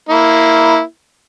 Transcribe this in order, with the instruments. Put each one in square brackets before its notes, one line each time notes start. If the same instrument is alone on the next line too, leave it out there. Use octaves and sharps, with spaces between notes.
[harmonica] A#3 E4